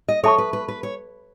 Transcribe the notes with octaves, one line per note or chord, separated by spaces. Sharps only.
D#5
A4 C#5 E5 A5 C#6
B4
B4
B4
C#5